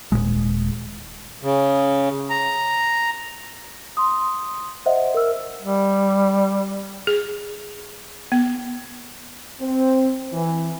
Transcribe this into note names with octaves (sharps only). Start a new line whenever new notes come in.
D#1 E2 A#2 G#3
C#3
A#5
C6 D#6
C5 D#5 E5 F#5
A#4 E5 E6 F6
G3
G#4
B3
C4
E3